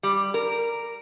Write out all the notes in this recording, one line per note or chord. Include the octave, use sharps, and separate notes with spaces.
G3
A#4